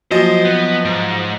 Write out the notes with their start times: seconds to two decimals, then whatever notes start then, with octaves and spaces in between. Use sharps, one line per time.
0.11 F3 F#3 A#3 F#4 C5 D#5
0.45 B3
0.85 G#2